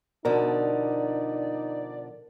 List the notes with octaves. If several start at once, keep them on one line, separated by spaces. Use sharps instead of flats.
B2 D3 F3 D#4 A#4 D5